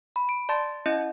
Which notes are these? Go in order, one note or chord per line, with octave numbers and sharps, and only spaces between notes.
B5
D7
D5 A5 C6 A6
C#4 E4 D#5